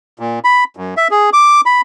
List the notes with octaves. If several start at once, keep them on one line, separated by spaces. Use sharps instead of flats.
A#2
B5
F#2
E5
G#4
D6
B5